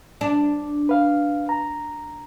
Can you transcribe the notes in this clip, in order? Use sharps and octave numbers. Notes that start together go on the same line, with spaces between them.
D4
B4 F5
A#5